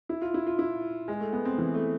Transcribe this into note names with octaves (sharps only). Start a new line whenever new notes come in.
E4
F4
E4
F4
E4
G#3
A3
B3
C4
E3
A3